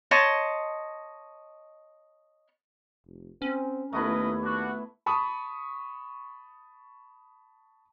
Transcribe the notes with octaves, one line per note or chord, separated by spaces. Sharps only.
C#5 D#5 A5 C6
F1
C4 C#4
D#2 A3 B3 E4 A#4 B4 D#5
D4 F#4
A5 B5 C#6 D#6